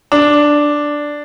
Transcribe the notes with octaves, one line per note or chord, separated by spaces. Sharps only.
D4